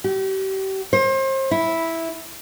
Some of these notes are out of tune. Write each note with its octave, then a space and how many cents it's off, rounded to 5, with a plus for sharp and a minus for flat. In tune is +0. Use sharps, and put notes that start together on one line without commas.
G4 -35
C5 +35
E4 -5